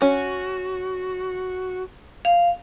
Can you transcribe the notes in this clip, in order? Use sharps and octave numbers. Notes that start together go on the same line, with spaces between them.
C#4 F#4
F5